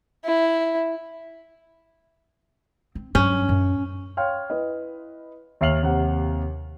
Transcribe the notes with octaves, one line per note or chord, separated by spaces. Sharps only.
E4
C4
G2 F#3 C#4
F#2
C#5 F5 G5 C6 F6
E4 B4 D#5
D#2 E5 F6 C7 F7 F#7
D#2 C3 F#5